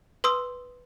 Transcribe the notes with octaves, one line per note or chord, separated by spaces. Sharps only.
B4 C6 D#6 E6